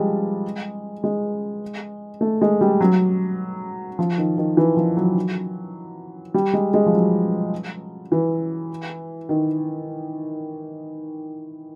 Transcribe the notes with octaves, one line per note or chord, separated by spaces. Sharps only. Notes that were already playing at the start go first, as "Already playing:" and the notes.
Already playing: F3 G3 G#3
G#3
A3
G#3
G3
F#3
F3
D#3
D#3
E3
F3
F#3
G3
G#3
G#3
F3
F#3
E3
D#3